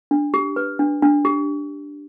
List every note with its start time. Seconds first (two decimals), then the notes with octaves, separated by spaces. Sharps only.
0.11 D4
0.34 G4
0.56 B4
0.79 D4
1.02 D4
1.25 G4